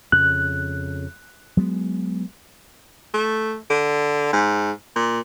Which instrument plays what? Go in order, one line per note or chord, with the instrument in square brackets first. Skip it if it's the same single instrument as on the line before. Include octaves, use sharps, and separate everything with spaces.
[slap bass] F2 C#3 [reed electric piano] F#6
[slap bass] F#3 G#3 B3
[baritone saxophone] A3
D3
G#2
A#2